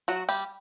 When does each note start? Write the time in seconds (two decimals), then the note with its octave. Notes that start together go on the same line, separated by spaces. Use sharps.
0.08 F#3 F#4
0.29 G3 G4